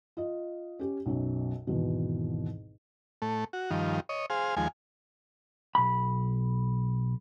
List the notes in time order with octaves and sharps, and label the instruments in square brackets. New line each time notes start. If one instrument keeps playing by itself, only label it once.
[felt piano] F4 D#5
C#4 G4
B1 F#2 B2
G#1 E2 B2
[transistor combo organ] A2 A3
F#4
G2 D#3 F3
C#5 D#5
G#4 C5 F5
D#2 F3 G#3 G#5
[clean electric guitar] B1 B5